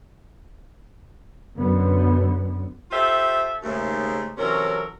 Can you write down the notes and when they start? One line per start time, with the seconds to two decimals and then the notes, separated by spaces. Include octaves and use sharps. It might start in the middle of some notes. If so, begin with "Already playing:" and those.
1.56 F#2 D3 B3
2.92 F4 G4 A4 C5 E5
3.63 D#2 G#2 C#3 A3
4.38 C3 E3 F#3 C#4 A4 A#4